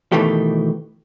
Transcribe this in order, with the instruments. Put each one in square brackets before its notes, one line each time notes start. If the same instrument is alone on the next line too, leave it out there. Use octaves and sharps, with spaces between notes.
[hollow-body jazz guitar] B2 D#3 E3 A3 G4